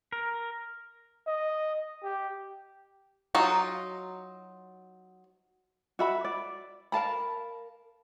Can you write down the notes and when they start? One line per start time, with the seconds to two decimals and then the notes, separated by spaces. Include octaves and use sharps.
0.12 A#4
1.26 D#5
2.03 G4
3.35 F#3 D#4 F4
5.99 F#4 E5 B5
6.25 D5
6.92 A#4 F5 A5 B5